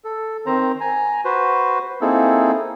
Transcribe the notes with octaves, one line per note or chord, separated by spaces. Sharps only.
A4
D#3 C4 C5 A#5
G#5 A#5
F#4 B4 C5
A#3 C4 D#4 E4 G#4 A4